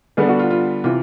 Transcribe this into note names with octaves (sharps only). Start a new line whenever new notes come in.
D3 G3 B3 D4 G#4
F#4
F4
F4
C3 E3 F4